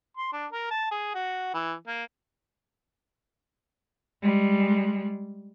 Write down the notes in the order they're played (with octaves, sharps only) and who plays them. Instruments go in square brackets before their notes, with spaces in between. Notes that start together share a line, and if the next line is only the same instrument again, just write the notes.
[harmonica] C6
D4
A#4
A5
G#4
F#4
E3
A#3
[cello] G3 G#3